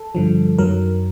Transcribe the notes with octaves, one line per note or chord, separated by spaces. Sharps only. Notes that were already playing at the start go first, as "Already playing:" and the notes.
Already playing: A4
G2 D3 F3
F#2 D#3 F#3 A#4